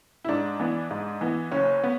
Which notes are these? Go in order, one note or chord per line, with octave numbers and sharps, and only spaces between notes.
E4
G#2 D4
E3 B3
G#2
E3 B3
F#1 C#4
B3